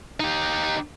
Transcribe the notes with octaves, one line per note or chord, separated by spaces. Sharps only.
D#4 G4